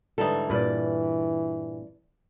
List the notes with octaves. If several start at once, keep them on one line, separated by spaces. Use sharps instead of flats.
G#2 D3 E3 G3 D#4 A4
G2 A#2 E3 B4 D5